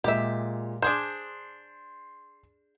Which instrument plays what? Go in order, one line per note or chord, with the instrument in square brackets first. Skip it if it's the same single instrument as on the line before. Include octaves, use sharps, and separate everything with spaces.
[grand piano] A#2 G#3 [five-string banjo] G4 E5
[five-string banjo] D4 G#4 C5 [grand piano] C6 G6